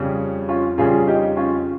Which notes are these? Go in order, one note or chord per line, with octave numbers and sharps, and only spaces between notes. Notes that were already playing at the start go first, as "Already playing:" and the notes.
Already playing: F2 C#3 G3
C#4 F4
F2 C#3 G3 F4 G#4
D#4 G4
C#4 F4